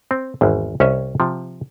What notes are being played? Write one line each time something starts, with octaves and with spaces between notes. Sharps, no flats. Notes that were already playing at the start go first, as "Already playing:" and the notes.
C4
G#1 E2
C2 C#4 C#5 D#5 E5
C3 F3